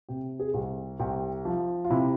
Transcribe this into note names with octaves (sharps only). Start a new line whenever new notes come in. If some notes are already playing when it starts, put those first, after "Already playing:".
C3 G4
G#4
C2
C2 G4
F3
F4
C3 E4